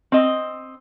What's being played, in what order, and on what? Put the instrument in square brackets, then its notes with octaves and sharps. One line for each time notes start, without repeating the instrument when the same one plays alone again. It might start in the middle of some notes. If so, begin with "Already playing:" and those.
[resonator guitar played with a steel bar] C4 D#5